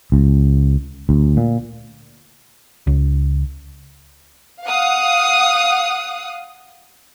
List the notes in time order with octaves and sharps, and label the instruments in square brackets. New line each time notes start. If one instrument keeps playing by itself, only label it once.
[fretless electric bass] C#2
D2
A#2
[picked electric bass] C#2
[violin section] F5 F#5 D#6